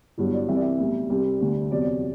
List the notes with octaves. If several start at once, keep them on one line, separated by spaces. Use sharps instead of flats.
G1 G2 F#3 E4
D5
C2 C3 E3 E5
D5
E5
B1 A2 G3
C2 C3 G3
D2 D3 G3
E2 C3 F#3 D5
D5